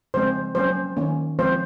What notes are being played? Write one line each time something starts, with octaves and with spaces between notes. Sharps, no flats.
C#3 F3 G#3 C4 C5
F#3 A#3 C#4 C5
D#3 A#3 C#4
F3 G#3 C4 C5